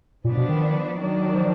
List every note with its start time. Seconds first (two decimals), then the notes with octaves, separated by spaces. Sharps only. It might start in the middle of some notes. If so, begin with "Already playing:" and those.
0.24 A#2 F3 B3 D4
0.37 B2
0.49 D#3
0.98 D#3 F#3 D4
1.34 F3